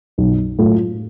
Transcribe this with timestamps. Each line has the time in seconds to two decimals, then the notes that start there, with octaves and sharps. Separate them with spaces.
0.18 B1
0.59 A2 F#3 A3 F4